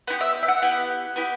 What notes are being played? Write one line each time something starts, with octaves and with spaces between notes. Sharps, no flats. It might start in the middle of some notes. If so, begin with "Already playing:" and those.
B3 E4 G4 F#5
E5
E5
F#5
B3 E4 G4
B3 E4 G4